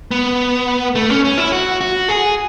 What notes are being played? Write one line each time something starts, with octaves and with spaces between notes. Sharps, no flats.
B3
A3
C#4
C#4
E4
F#4
F#4
G#4